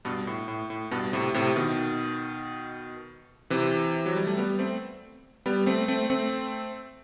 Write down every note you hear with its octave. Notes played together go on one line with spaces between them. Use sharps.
G2 B2
A2
A2
A2
G2 B2
A2 C3
A2 C3
B2 D#3
C3 E3
F#3
G3
A3
G3 B3
A3 C4
G3 B3
A3 C4
A3 C4
A3 C4